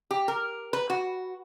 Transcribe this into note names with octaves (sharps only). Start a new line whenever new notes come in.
G4
A#4
B4
F#4